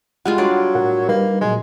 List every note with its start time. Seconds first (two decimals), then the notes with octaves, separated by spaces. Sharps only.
0.25 G3 G#3 F4 F#5
0.38 F#3 D4 D5
0.75 A2 A#4 F#5
1.09 G3 A#3 D#4 B4
1.41 A#2 F#3 G#3